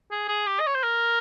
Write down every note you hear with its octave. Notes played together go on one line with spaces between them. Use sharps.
G#4
G#4
G4
D#5
C#5
C5
A#4